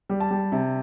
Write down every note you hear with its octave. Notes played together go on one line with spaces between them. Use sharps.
G3
A5
G3
C3